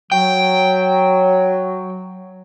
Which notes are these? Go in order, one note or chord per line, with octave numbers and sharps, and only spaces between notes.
F#3 G5